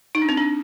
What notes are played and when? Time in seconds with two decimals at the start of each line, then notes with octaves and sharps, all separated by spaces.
0.15 D#4
0.22 D4
0.29 C4
0.37 D4